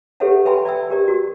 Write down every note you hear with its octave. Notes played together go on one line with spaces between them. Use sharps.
G4 A4 B4 C#5 E5 F#5
B4 E5 G5 G#5 B5 C6
D5 E5 G5 E6
G4 A#4 D5
F#4